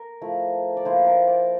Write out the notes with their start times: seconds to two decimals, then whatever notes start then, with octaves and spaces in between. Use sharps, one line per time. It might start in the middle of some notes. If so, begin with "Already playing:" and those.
Already playing: A#4
0.21 F3 A3 E4
0.77 D5
0.85 F3 A#3 E4 C5
1.07 A#4
1.28 D5